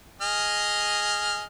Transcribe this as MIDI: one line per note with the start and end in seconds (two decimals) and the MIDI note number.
0.22 1.43 68
0.22 1.43 75
0.22 1.43 89